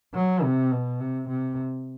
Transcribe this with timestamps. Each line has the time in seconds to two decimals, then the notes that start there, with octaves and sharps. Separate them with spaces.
0.14 F#3
0.43 C3
0.72 B2
1.00 C3
1.28 C3